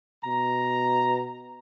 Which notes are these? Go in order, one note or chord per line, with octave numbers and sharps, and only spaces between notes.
B2 A#5